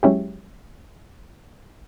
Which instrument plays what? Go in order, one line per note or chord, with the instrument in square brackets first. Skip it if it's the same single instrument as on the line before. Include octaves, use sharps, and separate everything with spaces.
[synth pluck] F#3 G#3 C#4 E4 G4